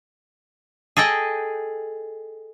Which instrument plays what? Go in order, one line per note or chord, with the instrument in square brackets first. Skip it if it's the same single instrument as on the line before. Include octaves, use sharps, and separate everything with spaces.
[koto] G#4 A4 D#5 G5